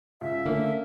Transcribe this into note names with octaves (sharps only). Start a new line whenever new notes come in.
C#2 E5
D3 A3 A#3 C#4